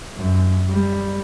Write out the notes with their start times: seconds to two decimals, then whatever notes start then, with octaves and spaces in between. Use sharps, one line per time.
0.17 F#2
0.70 G3